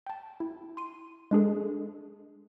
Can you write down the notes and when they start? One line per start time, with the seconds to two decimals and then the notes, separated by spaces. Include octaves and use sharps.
0.06 G5 A5
0.40 E4
0.77 C6 D#7
1.31 G#3 D4 G#4 A4